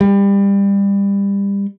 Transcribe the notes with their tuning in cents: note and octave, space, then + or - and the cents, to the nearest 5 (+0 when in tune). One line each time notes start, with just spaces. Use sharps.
G3 +25